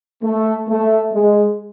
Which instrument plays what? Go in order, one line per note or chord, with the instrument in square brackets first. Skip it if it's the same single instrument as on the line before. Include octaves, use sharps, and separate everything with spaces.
[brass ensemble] A3
A3
G#3